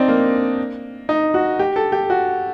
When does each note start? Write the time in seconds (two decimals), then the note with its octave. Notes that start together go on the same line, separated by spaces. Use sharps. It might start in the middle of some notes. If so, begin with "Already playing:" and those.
Already playing: C4 D4 D#4
0.08 A#3
1.09 D#4
1.34 F#4
1.59 G4
1.76 A4
1.92 G4
2.10 F#4